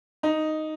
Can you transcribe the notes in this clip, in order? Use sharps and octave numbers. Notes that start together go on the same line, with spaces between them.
D#4